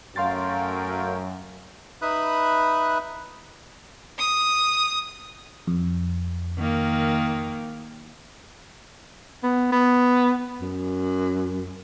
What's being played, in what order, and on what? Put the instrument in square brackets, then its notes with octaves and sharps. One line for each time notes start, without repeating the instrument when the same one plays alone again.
[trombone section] F#2 [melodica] A3 A#4 G5 [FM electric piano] F5 C6 A6
[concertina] D#4 B4 E5 B5 D#6 F#6
[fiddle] D#6
[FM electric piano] F2
[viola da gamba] D#3 A#3
[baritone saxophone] B3
B3
F#2